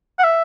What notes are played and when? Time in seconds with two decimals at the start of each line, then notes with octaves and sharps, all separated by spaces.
0.19 F#5
0.24 E5